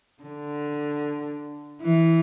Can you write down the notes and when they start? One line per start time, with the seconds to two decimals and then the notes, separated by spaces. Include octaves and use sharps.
0.23 D3
1.81 E3